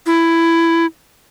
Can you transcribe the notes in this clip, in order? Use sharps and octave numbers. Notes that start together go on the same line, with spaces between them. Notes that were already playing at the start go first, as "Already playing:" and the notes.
E4